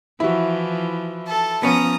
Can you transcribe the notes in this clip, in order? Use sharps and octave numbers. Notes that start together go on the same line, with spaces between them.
E3 F3 E4 F#4
A4 A5
F3 B3 C#4 A#5 D#6